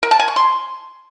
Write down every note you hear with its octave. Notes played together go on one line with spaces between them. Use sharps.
A#4
A5
G#5
C#6
C6